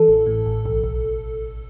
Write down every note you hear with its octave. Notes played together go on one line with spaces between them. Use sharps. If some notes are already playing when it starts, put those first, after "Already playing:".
Already playing: E3 A4
A1
A2
A1
B1
B1